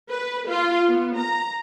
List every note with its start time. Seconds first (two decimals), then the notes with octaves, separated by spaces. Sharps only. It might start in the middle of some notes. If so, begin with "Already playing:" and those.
0.11 B4
0.48 F4
0.89 B3
1.17 A#5